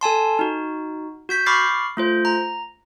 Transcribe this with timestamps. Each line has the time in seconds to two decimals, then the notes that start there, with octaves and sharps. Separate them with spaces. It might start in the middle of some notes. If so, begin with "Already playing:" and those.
0.01 A4 G#5 A5 C6
0.39 D#4 F#4
1.29 F#4 G6 B6
1.46 B5 C#6 D6 F6 A6 C7
1.97 A3 F4 C5
2.25 A#5